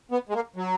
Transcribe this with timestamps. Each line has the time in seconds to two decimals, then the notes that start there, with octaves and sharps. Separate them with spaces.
0.11 B3
0.29 G#3
0.34 A#3
0.56 F#3